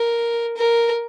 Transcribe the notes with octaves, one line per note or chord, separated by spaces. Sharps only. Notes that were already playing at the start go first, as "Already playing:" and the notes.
Already playing: A#4
A#4